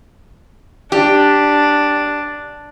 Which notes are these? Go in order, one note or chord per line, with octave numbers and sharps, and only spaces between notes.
D4 G4